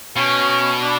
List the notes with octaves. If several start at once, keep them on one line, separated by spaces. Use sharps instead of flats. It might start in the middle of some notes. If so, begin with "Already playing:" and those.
B2 C#4
D4